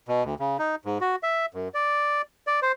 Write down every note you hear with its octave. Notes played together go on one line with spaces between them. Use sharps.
B2
D2
C#3
D#4
G#2
F#4
E5
F#2
D5
D5
C5